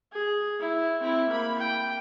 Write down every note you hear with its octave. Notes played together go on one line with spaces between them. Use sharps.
G#4
E4
C4 E4
A#3 B5
G5